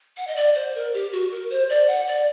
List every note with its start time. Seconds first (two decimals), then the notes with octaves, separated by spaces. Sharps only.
0.17 F#5
0.27 D#5
0.36 D5
0.55 C5
0.75 A#4
0.94 G4
1.12 F#4
1.31 A#4
1.50 C5
1.69 D5
1.88 F#5
2.07 D5